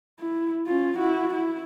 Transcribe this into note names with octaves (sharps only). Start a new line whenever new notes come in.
E4
C#4 F4
E4 F#4
E4